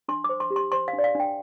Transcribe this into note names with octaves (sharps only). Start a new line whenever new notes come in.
D4 C6
C5 D6
C6
G4
C6
C5 C6
F5
D4
D5
F5
D4 G5